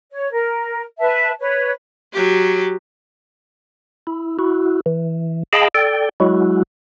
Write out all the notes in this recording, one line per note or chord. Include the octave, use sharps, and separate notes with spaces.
C#5
A#4
B4 E5 A5
B4 C#5
F#3 G4
E4
E4 F#4
E3
G#4 D#5 F5 G5 A5 B5
A4 D5 G5
F#3 G#3 E4 F#4